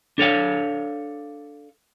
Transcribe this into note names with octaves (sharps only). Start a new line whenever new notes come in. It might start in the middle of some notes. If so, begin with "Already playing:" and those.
D4 A4 C#5 F5